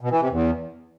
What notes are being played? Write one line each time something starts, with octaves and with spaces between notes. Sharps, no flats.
B2
E3
C3
E2